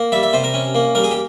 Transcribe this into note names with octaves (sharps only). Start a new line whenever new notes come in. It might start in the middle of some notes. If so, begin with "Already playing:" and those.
Already playing: A#3
G3 E5
E5
C3 C5
A#4
C#4
A#3
G3 A#4
G#4
G4